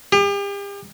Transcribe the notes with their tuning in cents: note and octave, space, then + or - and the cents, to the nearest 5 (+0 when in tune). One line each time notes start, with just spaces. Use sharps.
G4 +40